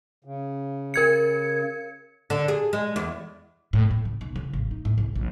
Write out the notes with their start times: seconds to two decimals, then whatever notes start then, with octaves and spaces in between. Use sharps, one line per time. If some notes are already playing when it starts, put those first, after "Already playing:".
0.24 C#3
0.94 A#4 G#6 C#7
2.30 D3
2.48 G#4
2.73 G#3
2.96 E2
3.73 A2
3.91 A2
4.05 C#3
4.21 B1
4.36 C#3
4.53 A1
4.71 D#4
4.85 A2
4.98 C2
5.16 A#1